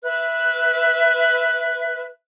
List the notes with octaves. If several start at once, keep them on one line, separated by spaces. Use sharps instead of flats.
B4 E5 F#6